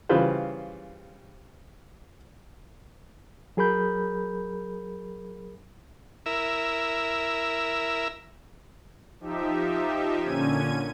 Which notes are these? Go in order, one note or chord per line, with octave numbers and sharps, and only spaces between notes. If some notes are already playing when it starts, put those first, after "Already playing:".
C#3 E3 G3 F4 B4 C5
F#3 G#4 A#4 B5 G6
E4 A#4 E5
F3 D#4 G4 E5
A#2 D3 C#4 G#6 D#7